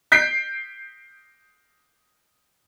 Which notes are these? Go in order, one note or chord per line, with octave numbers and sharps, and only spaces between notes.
G6 B6 C7 D7